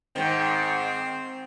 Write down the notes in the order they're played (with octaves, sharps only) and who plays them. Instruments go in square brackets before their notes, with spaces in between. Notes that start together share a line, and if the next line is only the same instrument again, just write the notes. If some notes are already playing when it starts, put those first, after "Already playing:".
[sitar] G#2 D#3 [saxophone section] C4